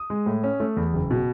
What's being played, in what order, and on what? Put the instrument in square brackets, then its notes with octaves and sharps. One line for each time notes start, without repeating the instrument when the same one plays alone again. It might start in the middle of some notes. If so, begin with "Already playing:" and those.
Already playing: [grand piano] D#6
G#3
A2
C#4
A3
E2
F#1
B2